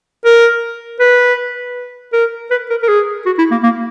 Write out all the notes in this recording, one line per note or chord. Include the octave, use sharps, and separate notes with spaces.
A#4
B4
A#4
B4
A#4
A#4
G#4
F#4
E4
A#3
A#3